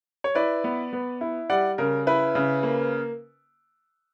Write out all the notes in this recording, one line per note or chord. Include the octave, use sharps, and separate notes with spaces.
C#5
E4 B4 D5
B3
B3
E4
G3 D5 F#5
C#3 A#4
E4 B4
C#3
A#3